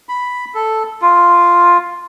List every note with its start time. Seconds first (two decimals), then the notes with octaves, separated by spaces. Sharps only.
0.09 B5
0.55 A4
1.02 F4